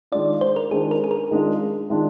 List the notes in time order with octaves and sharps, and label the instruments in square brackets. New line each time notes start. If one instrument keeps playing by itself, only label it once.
[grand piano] D#3 G#3 D4 F4 [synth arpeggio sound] D5
[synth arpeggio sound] C5
A#4
[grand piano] D#3 G#3 D4 F4 [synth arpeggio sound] G#4
[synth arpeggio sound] A#4
G#4
A#4
[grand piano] D#3 G#3 D4 F4
D#3 G#3 D4 F4